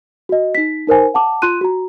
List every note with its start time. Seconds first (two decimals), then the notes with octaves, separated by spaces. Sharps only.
0.29 F#4 D#5
0.55 D#4 B6
0.87 D#4 A#4 C5 G#5
1.14 F#5 A5 D6
1.42 F4 C6 F#6 D#7
1.61 F#4 A#5